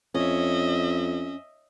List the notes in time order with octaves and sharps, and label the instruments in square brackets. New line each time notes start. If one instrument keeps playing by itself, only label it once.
[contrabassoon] F2 [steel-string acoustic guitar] C#4 [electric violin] D#5 E5